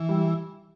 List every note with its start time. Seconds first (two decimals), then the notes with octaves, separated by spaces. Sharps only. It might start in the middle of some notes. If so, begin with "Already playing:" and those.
Already playing: E3
0.09 G3